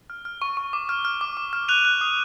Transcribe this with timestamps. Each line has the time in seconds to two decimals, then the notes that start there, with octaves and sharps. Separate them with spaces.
0.10 F6
0.25 F6
0.42 C#6
0.57 C#6
0.73 D6
0.89 F6
1.05 F6
1.21 D6
1.37 D6
1.53 F6
1.68 F#6 D#7 F7
1.85 F#6
2.01 D#6